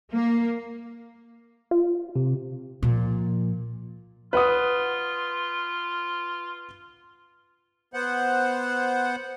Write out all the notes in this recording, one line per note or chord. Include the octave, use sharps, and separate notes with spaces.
A#3
F4
C3
A#2 F3
F4 B4 F#5 D#6
B3 C5 F#5